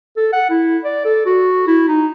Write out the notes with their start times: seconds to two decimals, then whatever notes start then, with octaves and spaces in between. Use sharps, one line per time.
0.17 A4
0.33 F#5
0.50 E4
0.84 D5
1.05 A4
1.26 F#4
1.67 E4
1.88 D#4